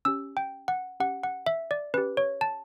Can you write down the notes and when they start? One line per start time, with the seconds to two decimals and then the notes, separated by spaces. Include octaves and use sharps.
0.05 C#4 G4 E6
0.37 G5
0.68 F#5
1.00 C#4 G4 F#5
1.24 F#5
1.46 E5
1.71 D5
1.94 C#4 G4 B4
2.17 C#5
2.41 A5